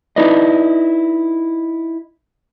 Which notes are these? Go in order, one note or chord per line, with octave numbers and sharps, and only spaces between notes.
D#4 E4 B4 D5 D#5